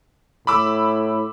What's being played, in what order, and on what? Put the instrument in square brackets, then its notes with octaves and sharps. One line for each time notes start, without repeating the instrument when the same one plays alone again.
[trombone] A2 [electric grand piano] B5 D6 E6